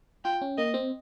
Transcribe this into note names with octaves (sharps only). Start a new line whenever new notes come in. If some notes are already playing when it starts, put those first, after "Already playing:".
F4 G5
C#4
A#3 D#5
C4